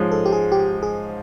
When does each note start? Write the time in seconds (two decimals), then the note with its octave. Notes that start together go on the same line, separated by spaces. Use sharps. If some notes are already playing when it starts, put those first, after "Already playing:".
Already playing: G#2 F3 G#3 C#4
0.12 A4
0.26 G4
0.32 G#4
0.52 G4
0.83 G#4